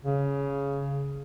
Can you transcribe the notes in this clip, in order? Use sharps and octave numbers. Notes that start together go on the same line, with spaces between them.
C#3